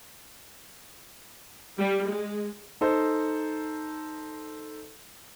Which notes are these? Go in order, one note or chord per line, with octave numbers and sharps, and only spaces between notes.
G3
G#3
D#4 A4 C5